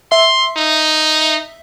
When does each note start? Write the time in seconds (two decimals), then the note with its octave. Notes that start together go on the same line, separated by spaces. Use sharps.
0.12 E5 C6
0.57 D#4